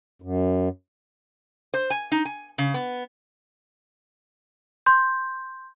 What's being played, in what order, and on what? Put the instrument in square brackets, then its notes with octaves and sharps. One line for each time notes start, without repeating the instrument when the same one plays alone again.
[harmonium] F#2
[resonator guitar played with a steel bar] C5
G#5
D#4
G#5
C#3
B3
[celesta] C6 G6